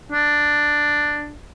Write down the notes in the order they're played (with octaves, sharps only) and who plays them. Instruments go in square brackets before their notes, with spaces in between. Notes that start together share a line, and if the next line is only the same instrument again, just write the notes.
[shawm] D4